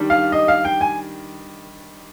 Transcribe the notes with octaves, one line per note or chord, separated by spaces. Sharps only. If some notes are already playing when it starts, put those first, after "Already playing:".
Already playing: D#3 G3 D4
F5
D#5
F5
G5
G#5